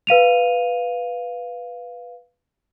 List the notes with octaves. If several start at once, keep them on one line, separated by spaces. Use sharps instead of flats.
B4 F5 D#7 F7